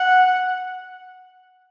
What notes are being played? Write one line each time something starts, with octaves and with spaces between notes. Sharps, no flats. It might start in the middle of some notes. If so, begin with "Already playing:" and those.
Already playing: F#5